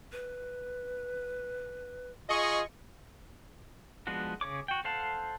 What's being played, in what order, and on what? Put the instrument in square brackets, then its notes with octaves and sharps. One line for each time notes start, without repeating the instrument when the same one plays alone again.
[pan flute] B4
[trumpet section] F4 G#4 [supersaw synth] D#5 C#6
[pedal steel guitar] F3 G#3 B3 D4 F#4
C#3 G#4 C#5 D6
F#4 G5
A4 C5 F5 F#5 A5